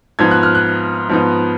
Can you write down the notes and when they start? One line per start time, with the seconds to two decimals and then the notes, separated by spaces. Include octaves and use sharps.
0.19 G#2 F3 B3 D#4 G#6
0.31 F#6
0.43 F6
0.55 F#6
1.09 G#2 F3 B3 D#4